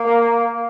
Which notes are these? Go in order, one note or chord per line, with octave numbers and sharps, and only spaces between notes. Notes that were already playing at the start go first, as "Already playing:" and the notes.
Already playing: A#3